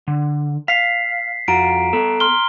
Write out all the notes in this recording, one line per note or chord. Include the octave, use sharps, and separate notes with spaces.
D3
F5 B6 C7
F2 F4 F#4 A#5 D7
B3 A4
C6 F6 G7